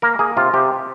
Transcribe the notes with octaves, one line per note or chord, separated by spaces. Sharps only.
A#3 A#4
A#3 G#4
C3 F4
C3 G4